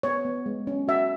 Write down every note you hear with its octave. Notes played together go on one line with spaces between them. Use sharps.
B3 C#5
B3
G#3
C#4
F#4 E5